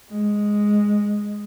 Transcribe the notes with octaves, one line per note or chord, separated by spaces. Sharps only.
G#3